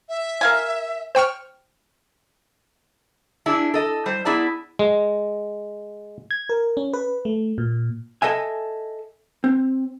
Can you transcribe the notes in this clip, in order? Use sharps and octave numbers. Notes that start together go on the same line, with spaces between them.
E5
A#4 F5 G#5
C5 G5 C#6 F6
D4 E4 G#4
A4 D#5
G3 C5
B3 E4 G#4 D5 A5
G#3
G#6
A#4
C#4
B4
A3
A#2
A4 D#5 E5 G#5
C4